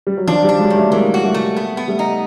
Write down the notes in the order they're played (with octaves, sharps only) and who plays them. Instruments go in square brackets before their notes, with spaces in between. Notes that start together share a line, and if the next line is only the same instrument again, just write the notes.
[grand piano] G3
F#3
[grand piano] D#3 F3 [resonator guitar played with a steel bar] D4
[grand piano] F3 G3
[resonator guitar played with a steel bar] D4
[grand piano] F#3 G#3
[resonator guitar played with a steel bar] D#3
[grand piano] G3 A3
[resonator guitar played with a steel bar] E3 [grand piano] G#3 A#3
[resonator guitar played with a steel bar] F#4
[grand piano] G3 A3
[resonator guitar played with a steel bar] A3
B3
B3
[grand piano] G3 A3
[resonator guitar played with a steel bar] D#4